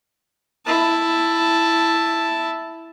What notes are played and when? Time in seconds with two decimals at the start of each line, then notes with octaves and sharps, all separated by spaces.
0.66 E4 A5